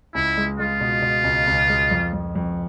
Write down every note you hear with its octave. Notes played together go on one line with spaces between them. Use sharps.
C#2 E4
G#3
G#3 F4
B2
B2
C#2
C#2
G#3
F2
F2
F2